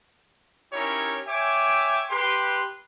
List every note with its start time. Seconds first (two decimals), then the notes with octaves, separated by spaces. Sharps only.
0.73 C#4 D#4 E4 G4 A#4 C#5
1.28 C#5 E5 G5 G#5 D6
2.10 G4 B4 C6